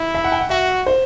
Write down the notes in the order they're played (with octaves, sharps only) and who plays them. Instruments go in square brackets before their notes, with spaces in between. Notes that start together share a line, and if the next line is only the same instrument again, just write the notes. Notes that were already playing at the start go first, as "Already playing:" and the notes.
Already playing: [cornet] E4
[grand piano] E5
F#5
G5
F#5
[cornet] F#4 [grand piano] E5
[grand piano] C5